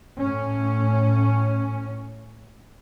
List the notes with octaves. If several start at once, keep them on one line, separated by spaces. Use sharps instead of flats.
A2 C#4